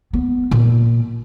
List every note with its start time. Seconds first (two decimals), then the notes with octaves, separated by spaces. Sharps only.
0.13 B3
0.51 A#2